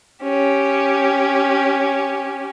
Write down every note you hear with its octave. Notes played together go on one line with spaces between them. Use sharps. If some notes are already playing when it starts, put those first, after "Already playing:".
C#4 G4